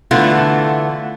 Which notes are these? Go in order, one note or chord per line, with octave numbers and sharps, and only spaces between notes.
D3 E3 A3 B3 F4